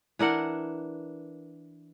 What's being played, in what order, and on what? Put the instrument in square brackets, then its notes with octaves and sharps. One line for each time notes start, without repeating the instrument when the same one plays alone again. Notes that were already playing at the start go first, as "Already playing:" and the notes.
[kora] E3 D4 A#4 F#5